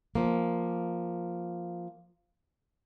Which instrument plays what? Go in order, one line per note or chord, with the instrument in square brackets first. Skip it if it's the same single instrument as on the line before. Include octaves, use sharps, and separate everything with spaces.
[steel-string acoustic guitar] F3 A#3